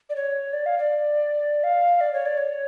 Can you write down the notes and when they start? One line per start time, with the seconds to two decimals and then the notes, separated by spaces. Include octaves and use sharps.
0.10 D5
0.16 C#5
0.53 D5
0.66 F5
0.79 D5
1.64 F5
2.01 D5
2.13 C#5
2.26 D5
2.37 C#5